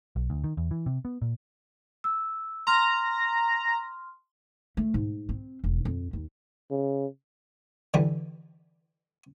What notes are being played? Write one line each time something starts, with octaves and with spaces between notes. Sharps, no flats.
B1
D2
D#3
E2
E3
C3
B3
A#2
E6
A#5 C6 F6
A3
G#2
C4
E1
F2
D#2
C#3
D3 E3 G3